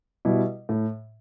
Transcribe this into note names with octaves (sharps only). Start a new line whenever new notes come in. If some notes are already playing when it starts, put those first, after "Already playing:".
B2 G3 E4
A2